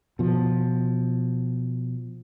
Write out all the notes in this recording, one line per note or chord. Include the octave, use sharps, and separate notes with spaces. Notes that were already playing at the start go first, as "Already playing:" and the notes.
B2 F3